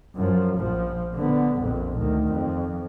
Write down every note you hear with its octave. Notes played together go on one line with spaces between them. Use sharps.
F#2 F3
A#1 F3
D3 B3
A#1 F2
D2 D#3
F2